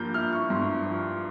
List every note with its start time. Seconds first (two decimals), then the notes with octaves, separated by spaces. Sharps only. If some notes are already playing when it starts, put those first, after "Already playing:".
Already playing: G2 F3 A#3 G6
0.14 E4 F6
0.33 C#6
0.50 G2 C6
0.67 C#6
0.85 F3